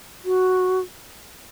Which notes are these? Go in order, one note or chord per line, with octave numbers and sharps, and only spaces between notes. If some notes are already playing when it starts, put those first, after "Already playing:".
F#4